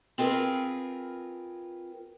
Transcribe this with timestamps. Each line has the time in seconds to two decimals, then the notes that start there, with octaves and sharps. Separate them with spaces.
0.18 C4 F4 G#4 A#4 B4